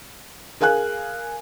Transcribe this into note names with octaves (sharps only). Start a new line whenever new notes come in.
G#4 A#4 F5 G#5 F#6